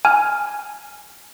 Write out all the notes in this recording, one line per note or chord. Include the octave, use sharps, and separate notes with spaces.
G#5 F6